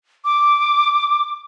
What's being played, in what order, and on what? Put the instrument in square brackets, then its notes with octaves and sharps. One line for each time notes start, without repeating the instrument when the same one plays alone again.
[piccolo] D6